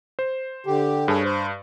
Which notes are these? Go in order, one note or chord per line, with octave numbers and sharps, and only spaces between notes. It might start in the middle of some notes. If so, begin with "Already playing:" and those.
C5
D3 G4
G2 G#4 A4 C#5
C5